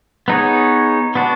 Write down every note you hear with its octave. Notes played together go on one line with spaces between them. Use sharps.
B3 D#4 G#4 C#5
B3 D4 F#4